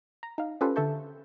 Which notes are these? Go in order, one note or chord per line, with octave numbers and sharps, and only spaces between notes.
A#5
D#4 F5
C#4 F4 G4 A4 B4 C5
D3 A4 E5 A5 C#6 G6